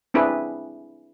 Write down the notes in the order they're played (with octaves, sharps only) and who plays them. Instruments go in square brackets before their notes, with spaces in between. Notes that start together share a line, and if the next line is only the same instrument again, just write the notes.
[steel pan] C4 D4 E4 G#4 B4